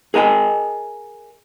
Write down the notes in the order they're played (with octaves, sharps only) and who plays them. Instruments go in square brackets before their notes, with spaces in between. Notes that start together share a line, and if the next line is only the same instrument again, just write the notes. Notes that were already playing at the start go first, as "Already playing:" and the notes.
[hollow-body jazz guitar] G#4 A#4 D#5 G5 G#5